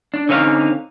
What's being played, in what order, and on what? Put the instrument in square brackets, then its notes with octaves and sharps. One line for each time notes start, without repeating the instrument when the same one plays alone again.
[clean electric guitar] D4
D3 C4 C#4 D#4 E4 F5